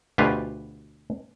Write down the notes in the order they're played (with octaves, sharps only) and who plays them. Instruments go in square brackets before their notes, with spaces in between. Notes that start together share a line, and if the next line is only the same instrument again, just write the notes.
[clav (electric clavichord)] D2 B2 F4 G4 B4 F5